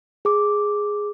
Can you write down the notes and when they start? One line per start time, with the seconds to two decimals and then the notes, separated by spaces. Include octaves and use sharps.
0.25 G#4 D6